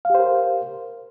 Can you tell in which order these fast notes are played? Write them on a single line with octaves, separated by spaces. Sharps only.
F5 G4 C5 A#4